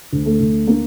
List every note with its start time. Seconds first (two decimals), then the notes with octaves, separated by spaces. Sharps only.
0.13 D2
0.26 A3
0.40 D2
0.67 D3 A#3